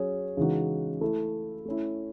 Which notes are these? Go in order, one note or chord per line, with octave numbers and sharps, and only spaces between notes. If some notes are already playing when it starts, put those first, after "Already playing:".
Already playing: F#3 C#4 G#4 C#5
C#3 E3 G#3 D#4 F#4
A3 E4 A4
A3 C#4 E4